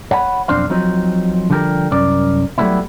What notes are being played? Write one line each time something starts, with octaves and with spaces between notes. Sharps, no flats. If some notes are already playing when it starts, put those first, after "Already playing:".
C#5 F#5 G#5 B5
B1 F2 C4 D4 C5 F5
F3 F#3 C4 D#4
D3 F3 G3 G4 A4 A#4
C2 F#2 C#4 A#4 D5
F#3 G3 A3 B3 C#4 E4